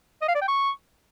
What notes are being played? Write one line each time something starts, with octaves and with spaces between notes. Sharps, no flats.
D#5
F5
D5
G5
C#6